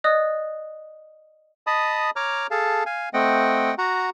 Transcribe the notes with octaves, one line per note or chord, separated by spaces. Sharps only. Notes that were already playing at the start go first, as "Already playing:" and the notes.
D5 D#5 D#6 F#6
D#5 A5 B5 D#6
C#5 A#5 D6 F6
G#4 A4 F5 A5
F5 G#5
A3 C4 D#5 F#5 G5
F#4 F#5 A#5